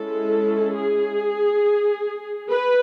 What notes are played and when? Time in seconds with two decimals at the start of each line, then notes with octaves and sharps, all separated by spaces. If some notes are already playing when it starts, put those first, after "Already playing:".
Already playing: G#3 C#4 E4 A4
0.75 G#4
2.51 B4